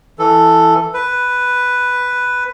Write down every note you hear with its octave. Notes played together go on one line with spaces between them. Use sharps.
E3 A4
B4